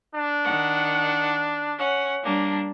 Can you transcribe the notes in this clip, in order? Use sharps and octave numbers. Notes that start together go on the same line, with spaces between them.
D4
D#3 F#5
C#4 F#5
G3 A#3 D4